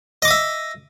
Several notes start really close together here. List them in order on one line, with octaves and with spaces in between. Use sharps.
D#5 D6 D#6 E5